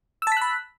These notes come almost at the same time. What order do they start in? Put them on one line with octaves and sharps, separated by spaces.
E6 A5 B6 F#6 B5